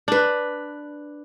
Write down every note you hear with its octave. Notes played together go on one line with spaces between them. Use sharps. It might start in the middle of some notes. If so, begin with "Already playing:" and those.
D4 B4